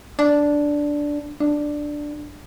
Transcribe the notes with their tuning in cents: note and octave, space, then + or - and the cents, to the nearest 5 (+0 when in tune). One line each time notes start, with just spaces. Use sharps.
D4 -5
D4 +5